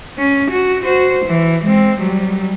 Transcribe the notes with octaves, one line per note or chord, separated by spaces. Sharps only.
C#4
F#4
F#4 C5
E3
G#3 C4
F#3 G3